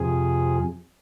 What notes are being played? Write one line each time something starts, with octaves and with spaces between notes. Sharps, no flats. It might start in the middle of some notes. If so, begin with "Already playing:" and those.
Already playing: F2 C3 F3 G#4